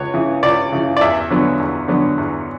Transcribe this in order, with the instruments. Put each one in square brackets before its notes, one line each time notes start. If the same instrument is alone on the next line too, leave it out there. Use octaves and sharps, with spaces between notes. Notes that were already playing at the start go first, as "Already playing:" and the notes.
Already playing: [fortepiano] C#2 B4 C#5
C#3 E3
C#2 D5
C#3 E3
D5
E2 E5
D3 F#3 B3
E2
D3 F#3 B3
E2